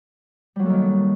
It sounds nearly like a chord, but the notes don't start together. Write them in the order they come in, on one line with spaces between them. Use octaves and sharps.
G3 F#3 A#3 A4 D#3